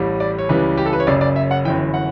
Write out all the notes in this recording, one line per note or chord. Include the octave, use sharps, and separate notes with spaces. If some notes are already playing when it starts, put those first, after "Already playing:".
Already playing: A1 A2 G3
D5
C#5
C#2 C#3 E3 G3 B4
G4
A4
B4
C#5
F#1 F#2 C#3 D5
D5
E5
F#5
G1 F#2 E3 G5
F#5